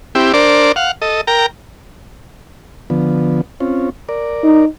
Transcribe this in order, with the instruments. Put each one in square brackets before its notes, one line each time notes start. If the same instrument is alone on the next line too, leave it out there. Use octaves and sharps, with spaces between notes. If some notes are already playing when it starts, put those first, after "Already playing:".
[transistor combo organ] C4 E4 G4
D4 A#4 C5 D5
F5 F#5
A4 D#5
A#4 G5 A#5
D3 F3 B3
C4 C#4 F4
A#4 D5
[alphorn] D#4